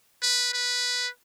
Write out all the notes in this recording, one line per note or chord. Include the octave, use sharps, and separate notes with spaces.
B4
B4